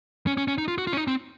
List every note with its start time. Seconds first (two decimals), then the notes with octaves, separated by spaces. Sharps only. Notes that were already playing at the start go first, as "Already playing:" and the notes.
0.27 C#4
0.37 C#4
0.48 C#4
0.58 D#4
0.68 F4
0.78 F#4
0.87 F4
0.92 C#4
0.97 D#4
1.08 C4